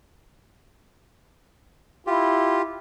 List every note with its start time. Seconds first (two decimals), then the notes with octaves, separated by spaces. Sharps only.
2.07 E4 F4 G4